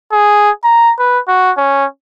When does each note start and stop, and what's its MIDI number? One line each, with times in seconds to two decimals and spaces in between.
0.12 0.51 68
0.64 0.93 82
0.99 1.19 71
1.28 1.51 66
1.57 1.85 61